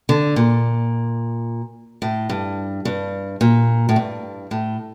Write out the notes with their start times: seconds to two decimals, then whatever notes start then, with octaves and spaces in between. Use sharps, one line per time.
0.09 D3
0.36 A#2
2.02 A2
2.29 G2
2.85 G2
3.41 A#2
3.89 A2
3.96 G2
4.51 A2